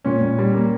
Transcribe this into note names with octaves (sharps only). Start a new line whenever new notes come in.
A#2 C#4
A#2
G3
A#3